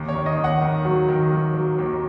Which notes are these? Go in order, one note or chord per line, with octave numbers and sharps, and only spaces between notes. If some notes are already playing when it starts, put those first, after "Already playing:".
Already playing: D#2
C#5
D#3
D#5
D#2
F#5
D#3
F#3
D#3
F#3
F#3
D#2